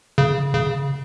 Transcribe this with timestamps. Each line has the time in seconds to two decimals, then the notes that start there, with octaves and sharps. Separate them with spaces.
0.18 C#3
0.53 C#3